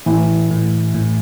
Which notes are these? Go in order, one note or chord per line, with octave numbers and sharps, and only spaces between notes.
A2 E3
A2
A2